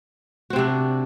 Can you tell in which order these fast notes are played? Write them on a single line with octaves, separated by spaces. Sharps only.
F#4 C4 C3 D4